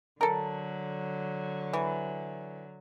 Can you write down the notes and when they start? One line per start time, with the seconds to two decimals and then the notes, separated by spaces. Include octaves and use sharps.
0.21 D3 F#3 A4 A#4
1.73 E3